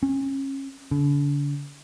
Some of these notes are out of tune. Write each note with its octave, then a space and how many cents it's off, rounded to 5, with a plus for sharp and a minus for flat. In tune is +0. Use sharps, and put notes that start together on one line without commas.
C#4 -30
D3 -40